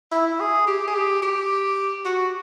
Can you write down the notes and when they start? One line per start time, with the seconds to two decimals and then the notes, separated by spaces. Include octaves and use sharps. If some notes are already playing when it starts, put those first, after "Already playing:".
0.12 E4
0.40 G#4
0.67 G4
0.88 G#4
0.94 G4
1.22 G4
2.05 F#4